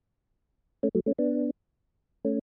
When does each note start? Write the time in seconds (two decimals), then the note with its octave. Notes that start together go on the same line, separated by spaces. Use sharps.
0.83 A3 C#4
0.95 F#3 A3
1.06 A3 C#4
1.19 B3 D4
2.25 A3 C#4